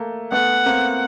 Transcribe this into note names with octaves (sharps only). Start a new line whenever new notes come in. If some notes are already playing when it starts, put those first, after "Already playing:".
Already playing: A3 A#3
A3 B3 F#5
A#3 C4